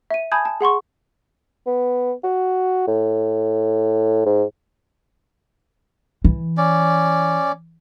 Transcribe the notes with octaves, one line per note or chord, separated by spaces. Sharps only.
E5 D#7
G#5 A5 B5 D#6 G6 G#6
A5
G#4 F#5 C6 C#6
B3
F#4
A2
G#2
E3
C#4 D5